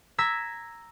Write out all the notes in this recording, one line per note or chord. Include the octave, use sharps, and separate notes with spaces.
A#5 E6 G#6 B6